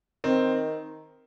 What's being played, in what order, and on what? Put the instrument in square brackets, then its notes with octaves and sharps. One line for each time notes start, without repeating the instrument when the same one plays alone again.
[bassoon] D#3 [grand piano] C4